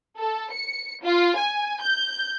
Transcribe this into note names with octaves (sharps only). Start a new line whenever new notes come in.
A4
C#7
F4
G#5
G6